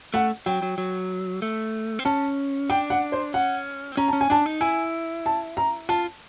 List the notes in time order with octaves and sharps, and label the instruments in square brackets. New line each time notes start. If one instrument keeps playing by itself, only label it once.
[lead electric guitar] A3 [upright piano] F#5
[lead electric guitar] F#3 [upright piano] G5
[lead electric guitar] F#3
F#3
A3
C4
[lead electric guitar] C#4 [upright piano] A5
[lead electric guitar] D4 [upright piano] G5
[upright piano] F#5
C5
[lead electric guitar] C#4 [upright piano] F#5
[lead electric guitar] C4
[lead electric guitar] C#4 [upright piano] A#5
[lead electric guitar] C#4 [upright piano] A5
[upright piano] G#5
[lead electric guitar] D4 [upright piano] A5
[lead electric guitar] D#4
[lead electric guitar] E4 [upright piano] G#5
[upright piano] A5
A#5
[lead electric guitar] F4 [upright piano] A5